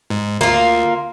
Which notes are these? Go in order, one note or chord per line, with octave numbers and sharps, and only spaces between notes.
G#2
D2 A#3 F4